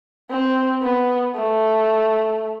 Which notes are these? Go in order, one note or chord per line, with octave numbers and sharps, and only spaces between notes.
C4
B3
A3